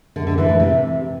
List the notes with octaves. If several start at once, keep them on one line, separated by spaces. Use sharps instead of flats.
D3
D3
E3
A2
C3